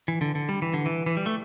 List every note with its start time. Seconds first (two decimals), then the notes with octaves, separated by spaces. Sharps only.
0.08 E3
0.21 D3
0.35 D3
0.49 G3
0.62 E3
0.74 D3
0.86 E3
1.06 E3
1.17 G3
1.26 A3